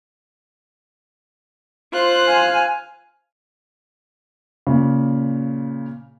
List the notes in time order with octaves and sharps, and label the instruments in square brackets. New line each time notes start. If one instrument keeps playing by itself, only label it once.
[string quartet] F4 C5 F#6
[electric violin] F5 G#5
[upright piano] A#2 C#3